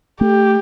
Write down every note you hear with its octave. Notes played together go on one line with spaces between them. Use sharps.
A3 G4